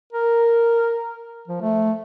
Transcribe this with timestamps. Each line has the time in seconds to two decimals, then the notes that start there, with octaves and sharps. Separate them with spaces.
0.13 A#4
1.48 F3
1.62 A3